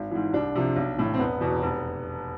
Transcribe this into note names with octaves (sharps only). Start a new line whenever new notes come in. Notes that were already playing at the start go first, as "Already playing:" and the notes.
Already playing: G#1
G#2 E3
C2 D4
C3 F3
B1
A2 E3
C4
E1 B3
E2 B2
F1